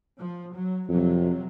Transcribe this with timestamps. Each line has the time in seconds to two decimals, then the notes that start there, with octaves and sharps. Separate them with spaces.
0.19 F3
0.54 F#3
0.88 F2 C3 F#3